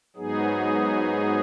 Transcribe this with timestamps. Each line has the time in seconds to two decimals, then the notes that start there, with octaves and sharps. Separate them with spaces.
0.16 G#2 F#3 B3 D#4 G#4